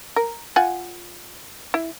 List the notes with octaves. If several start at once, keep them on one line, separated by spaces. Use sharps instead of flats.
A#4
F4 F#5 G#5
E4